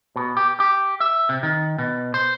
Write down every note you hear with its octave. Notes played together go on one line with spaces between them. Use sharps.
B2
G4
G4
E5
C3
D#3
B2
C5